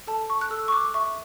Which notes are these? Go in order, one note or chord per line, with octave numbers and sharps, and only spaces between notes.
A4 A5
C#6
F#6
A4 E6
C#6
D6
E5 C#6